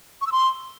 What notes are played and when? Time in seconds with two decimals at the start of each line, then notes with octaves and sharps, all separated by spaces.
0.21 C#6
0.27 E6
0.32 C6